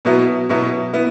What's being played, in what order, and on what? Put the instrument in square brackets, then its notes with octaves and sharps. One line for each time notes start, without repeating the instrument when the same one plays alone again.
[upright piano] B2 F#3 B3 E4
B2 F#3 B3 E4
B3 E4